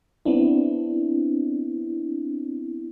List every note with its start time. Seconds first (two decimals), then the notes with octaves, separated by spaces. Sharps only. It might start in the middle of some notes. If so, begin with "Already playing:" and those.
0.25 B3 C4 D4 E4